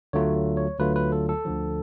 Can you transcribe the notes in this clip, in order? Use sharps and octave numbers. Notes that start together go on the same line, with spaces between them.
D2 D3 F#3 A3 F4 C#5
C#5
D2 D3 F#3 A3 F4 B4
B4
A4
A4
D2 D3 F3